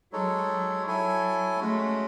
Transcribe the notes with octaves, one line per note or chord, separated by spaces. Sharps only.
F#3 G#3 D#4 A4 C#5
F#3
E4 A4 C#5 G#5
G#3 A3 C#4 F#4